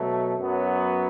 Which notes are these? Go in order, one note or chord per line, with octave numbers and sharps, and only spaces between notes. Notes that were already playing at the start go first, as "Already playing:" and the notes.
Already playing: B2 F#3 A3
F#2 F#3 B3